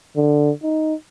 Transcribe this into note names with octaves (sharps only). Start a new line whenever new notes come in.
D3
D#4